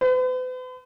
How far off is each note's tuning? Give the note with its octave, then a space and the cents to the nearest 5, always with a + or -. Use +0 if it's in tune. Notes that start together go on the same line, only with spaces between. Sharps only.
B4 +45